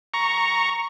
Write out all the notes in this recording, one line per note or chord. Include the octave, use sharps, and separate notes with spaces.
A#5 C#6